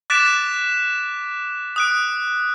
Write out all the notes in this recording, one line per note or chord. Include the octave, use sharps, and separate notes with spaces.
D6 F#6 A6 B6 D7 E7
D#6 F#6 D7